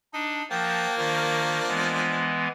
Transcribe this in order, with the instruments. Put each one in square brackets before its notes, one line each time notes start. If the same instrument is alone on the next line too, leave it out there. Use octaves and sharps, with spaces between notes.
[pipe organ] D4 [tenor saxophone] D#4
[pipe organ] F3 [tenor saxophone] A#3 [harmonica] F#4 G5 A5
[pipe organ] D#3 [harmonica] F3 D4
[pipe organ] E3 G#3 B3